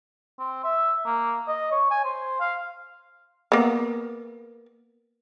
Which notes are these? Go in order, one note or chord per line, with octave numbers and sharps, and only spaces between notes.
C4
E5
A#3
D#5
C#5
G#5
C5
F5
A#3 B3